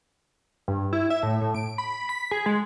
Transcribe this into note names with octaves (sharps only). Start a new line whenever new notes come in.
G2
E4
E5
A2
A2
D7
B5
B6
G#4
G#3